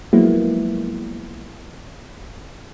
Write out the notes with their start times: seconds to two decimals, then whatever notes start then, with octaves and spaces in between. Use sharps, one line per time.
0.13 F3 F#3 G#3 A#3 B3 E4